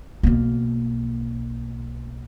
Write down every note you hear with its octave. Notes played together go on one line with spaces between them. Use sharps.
B1 A#3